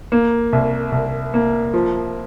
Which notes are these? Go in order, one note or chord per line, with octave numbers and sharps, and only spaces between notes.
A#3
C2
C2
A#3
F3